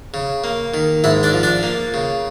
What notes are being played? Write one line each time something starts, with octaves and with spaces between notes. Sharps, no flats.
C#3
A#3
D#3
G#2 E4 E5
D4 D5
F3
D4 D5
A#3
C#3